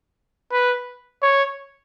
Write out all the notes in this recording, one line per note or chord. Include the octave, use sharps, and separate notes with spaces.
B4
C#5